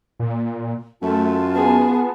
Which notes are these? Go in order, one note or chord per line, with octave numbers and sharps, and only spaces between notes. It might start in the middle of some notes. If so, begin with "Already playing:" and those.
A#2
F#2 A3 F4 A5
B3 G#4